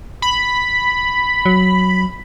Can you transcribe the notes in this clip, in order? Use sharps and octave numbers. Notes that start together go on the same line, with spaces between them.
B5
F#3